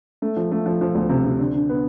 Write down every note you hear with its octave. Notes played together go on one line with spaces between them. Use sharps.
A3
F3
A3
F3
F3
D2
C3
C3
D3
D3
B3